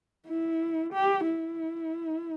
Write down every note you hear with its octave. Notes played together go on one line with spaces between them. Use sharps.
E4
G4
E4